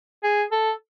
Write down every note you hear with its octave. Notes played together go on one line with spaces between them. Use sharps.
G#4
A4